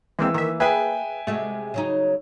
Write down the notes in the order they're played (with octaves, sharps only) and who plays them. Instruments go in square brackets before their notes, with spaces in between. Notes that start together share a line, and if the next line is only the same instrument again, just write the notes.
[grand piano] E3 E6 [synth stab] G#3 A#3 C4
[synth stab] D#3 E5 [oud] A#3
[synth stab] G#4 B4 [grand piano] E5 G5 G#5
[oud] C3 G#3 F#4 [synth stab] A3
[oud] C#3 F#3 D#4